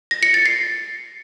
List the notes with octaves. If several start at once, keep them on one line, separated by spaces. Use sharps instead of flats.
A#6
C#7
A6
C7